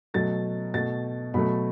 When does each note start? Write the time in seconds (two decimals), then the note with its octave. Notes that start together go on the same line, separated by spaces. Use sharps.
0.14 B2 F#3 A3 A6
0.74 B2 A3 A6
1.34 B2 F#3 A3 B5